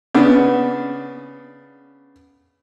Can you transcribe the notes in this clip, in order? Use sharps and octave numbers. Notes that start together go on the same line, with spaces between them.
C#3 B3 D4